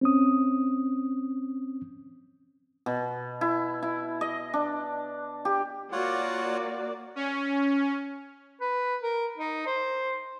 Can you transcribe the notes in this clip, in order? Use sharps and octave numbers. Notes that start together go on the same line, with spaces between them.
C4 C#4 D#6
B2
E4
E4
D#5
D4
G4
A#3 F4 F#4 C#5 D5 F#5
C#4
B4
A#4
D#4
C5